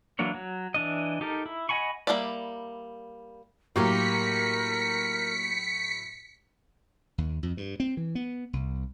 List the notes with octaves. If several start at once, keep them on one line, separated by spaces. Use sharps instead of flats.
E3 F#3 A#3 D4 C#5
F#3
E3 D4 D#5
D#4 G4 A4 A#4
E4
D#5 F#5 G#5 B5 C#6
G3 A#3 D4 E4 D5
A2 F#3 A#3 G4 A#4 C6 B6 C#7
D#2
F2
G2
C4
E3
B3
C2